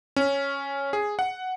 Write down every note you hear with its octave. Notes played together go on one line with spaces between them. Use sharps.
C#4
G#4
F#5